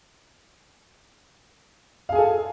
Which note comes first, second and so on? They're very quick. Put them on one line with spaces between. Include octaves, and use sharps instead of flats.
F5 G#4 G#5 A4